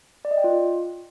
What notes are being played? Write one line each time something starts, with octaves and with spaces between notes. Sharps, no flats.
D5
D#5
G5
F4